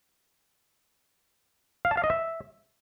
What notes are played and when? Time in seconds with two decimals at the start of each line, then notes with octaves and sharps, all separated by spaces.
1.85 F5
1.91 A5
1.97 F5
2.04 D#5
2.10 E5